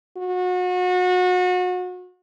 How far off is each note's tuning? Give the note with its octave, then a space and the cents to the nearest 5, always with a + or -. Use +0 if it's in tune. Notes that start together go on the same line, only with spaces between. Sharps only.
F#4 -30